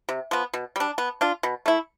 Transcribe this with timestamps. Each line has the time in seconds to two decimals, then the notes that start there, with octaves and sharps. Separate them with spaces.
0.09 C3
0.31 F3 B3
0.53 B2
0.76 G3 D4
0.98 B3
1.21 D4 F4
1.43 B2
1.66 A3 E4